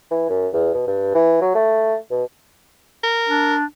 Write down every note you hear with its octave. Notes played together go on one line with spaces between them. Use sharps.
E3
F#2
E2
B2
G2
E3
F#3
A3
B2
A#4
D4